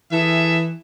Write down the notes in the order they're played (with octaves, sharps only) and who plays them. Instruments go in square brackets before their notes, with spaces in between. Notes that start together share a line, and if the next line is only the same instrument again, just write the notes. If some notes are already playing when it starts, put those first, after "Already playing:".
[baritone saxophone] E3 [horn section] G#4 A4 E5